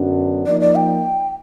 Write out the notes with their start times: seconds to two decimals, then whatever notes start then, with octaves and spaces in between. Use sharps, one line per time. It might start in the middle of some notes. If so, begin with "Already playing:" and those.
Already playing: F#2 D3 F#3 B3 D4
0.46 F3 A#3 D#4 D5
0.61 D5
0.75 G5